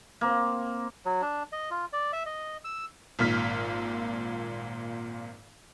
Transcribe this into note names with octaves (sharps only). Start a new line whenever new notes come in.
A#3 C4
F#3
D4
D#5
F4
D5
E5
D#5
E6
G#1 A#2 F6 B6